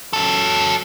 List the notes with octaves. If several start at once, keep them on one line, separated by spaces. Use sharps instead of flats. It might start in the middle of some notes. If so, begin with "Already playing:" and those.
F#3 A4